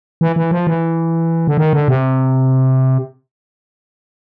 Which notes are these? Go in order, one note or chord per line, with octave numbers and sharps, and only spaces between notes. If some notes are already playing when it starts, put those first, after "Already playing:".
E3
E3
F3
E3
D3
D#3
D3
C3